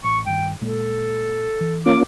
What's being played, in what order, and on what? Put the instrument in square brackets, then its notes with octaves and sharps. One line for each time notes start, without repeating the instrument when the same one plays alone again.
[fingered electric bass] A1 [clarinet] C#6
[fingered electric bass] G2 D#3 [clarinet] G5
[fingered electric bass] A#2 G#3 A#3 [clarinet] A4
[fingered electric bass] E3
[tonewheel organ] A#3 C#4 F4 [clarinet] D6